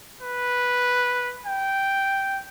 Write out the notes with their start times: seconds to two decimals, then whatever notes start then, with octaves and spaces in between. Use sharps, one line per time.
0.21 B4
1.46 G5